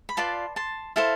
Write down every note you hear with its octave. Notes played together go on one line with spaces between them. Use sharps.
B5
F4 B4 D5 A5 C6
A5 C6
E4 A4 C5 F5 A5